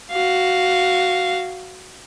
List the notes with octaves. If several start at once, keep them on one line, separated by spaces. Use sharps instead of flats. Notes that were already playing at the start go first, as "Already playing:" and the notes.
F#4 F5